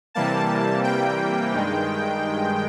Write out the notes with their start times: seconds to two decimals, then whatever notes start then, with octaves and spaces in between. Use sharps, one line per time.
0.14 C3 E3 G3 A#3 A5
0.84 G5
1.53 G2 D#3 G#3